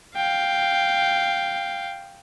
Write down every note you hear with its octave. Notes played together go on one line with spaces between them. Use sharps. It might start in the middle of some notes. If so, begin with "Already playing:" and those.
F5 G5